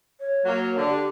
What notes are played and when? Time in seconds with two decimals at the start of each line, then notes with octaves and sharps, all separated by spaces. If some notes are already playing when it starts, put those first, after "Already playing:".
0.20 C#5
0.45 F#3 A#3
0.77 D3
0.90 G4